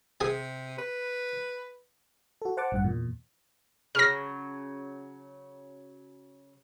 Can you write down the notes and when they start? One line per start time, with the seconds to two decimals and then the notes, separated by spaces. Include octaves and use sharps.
0.21 C3 G#4 G#5
0.78 B4
2.42 F#4 A4
2.57 C5 F#5 A5 D6
2.72 A1 G2 F#5
2.84 E2 A#2
3.95 C#3 E3 F#3 F6 A#6